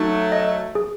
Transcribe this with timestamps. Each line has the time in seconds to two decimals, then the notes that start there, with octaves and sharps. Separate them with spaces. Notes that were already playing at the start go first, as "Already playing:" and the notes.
Already playing: F#3 A3 D#4
0.32 D#5
0.75 G#4